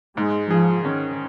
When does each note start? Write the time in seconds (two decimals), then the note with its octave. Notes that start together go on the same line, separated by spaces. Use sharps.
0.17 G#2 G#3
0.50 F3 G#4
0.85 D#3 C#4